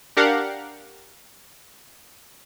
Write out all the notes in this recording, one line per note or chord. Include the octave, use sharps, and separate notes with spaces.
D4 G4 A#4 F5 F#5